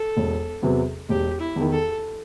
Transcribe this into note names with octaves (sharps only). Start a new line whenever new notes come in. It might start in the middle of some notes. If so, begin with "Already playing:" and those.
Already playing: A4
E1
E2 C3 F#3 B3
E1 G4
E4
E2 D#3
A4